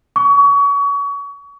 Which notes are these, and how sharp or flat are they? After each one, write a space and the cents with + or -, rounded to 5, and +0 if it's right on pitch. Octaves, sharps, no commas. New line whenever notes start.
C#6 +30